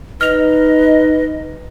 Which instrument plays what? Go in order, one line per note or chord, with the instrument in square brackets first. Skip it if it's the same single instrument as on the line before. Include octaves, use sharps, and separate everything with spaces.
[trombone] D#4 [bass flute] B4 [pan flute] D#5 [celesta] F6 F7